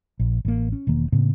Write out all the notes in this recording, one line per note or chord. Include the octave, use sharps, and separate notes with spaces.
A#1
A1 A#3
C#4
E1 D#3 A#3
A2 C#3 A#3 C4